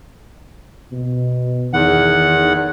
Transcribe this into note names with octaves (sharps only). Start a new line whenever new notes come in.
B2
E2 D#3 F#5